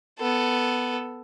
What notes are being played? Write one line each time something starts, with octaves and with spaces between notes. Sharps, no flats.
B3 A4